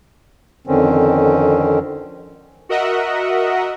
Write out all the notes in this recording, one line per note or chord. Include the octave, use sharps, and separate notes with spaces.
F2 D3 D#3 C4 C#4
F#4 A#4 D#5 E5 F#5